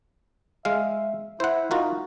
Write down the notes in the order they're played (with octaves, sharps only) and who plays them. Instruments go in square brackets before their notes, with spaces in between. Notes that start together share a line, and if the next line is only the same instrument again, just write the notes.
[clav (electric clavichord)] G#3 F5 [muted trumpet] E5
[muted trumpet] E4 [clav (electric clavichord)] C5 F#5
[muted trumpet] D#4 [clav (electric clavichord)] F4 F#4 A#4